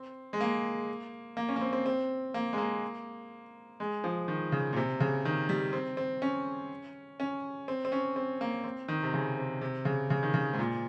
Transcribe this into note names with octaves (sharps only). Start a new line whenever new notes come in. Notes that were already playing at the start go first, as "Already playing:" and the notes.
Already playing: C4
G#3
A#3
A#3
C#4
A#3
C4
C4
C4
A#3
G#3
A#3
G#3
F3
D#3
C#3
A#2
C3
C#3
D#3
G3
C4
C4
C#4
C#4
C4
C4
C#4
C4
A#3
C4
D#3
C3
C#3
C3
C3
C#3
C#3
D#3
C#3
G#2
A#2